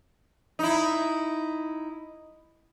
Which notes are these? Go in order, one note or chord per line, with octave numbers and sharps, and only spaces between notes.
D#4 E4